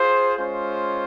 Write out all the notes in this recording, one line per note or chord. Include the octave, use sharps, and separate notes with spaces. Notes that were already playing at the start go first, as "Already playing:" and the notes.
Already playing: F4 G#4 C5
G#3 C#4 F4 C5